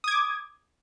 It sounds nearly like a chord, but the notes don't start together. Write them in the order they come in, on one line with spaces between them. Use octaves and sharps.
D#6 G#6 D6